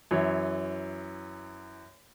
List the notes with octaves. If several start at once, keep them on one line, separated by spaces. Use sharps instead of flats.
F#2 E3 C#5